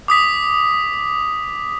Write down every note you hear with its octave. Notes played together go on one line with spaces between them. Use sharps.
D6 D#6 B6